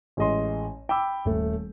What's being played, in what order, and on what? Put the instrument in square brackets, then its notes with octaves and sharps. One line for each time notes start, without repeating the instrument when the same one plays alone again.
[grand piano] A1 G#3 D#5 C6
G5 B5 D6 E6
D#1 A3